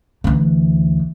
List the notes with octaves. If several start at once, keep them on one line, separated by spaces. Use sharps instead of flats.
D2 E3